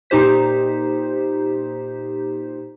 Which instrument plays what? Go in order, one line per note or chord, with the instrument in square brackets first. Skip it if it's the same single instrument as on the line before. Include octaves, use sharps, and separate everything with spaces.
[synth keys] A#2 D#4 G4 C5 B6